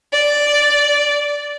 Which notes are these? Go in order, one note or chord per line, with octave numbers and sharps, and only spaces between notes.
D5